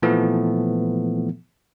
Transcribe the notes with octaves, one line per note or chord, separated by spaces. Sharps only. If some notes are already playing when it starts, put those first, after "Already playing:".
A#2 E3 F3 A3 B3